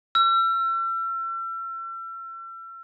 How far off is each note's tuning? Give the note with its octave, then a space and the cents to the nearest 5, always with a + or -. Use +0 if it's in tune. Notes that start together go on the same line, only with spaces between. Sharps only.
E6 +40